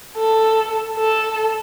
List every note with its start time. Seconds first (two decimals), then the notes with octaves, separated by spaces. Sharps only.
0.18 A4
0.98 A4